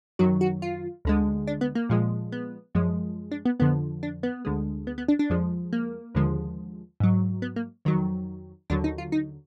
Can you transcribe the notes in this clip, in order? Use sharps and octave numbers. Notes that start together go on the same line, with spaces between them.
F#2 D#3 F#3 F#4
F#4
F4
D2 D3 G#3
D4
B3
A#3
A#2 F3 G#3
B3
F#2 F3 G#3
D4
B3
F2 D3 F3 B3
D4
B3
D2 D3 G#3
B3
B3
D4
D4
F2 F3 G#3
A#3
D#2 D3 F3 G#3
G#2 F#3
B3
A#3
F2 D#3 F#3
D#2 D3 F#3 D4
D#4
F4
D#4